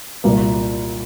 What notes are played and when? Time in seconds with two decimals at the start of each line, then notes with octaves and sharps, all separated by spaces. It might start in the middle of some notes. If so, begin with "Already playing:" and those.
0.24 C2 A#2 A#3